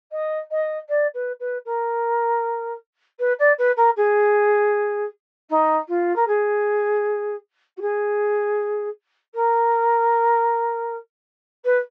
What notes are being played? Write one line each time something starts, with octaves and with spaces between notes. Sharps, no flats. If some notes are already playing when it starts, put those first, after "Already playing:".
D#5
D#5
D5
B4
B4
A#4
B4
D5
B4
A#4
G#4
D#4
F4
A#4
G#4
F#4
G#4
A#4
B4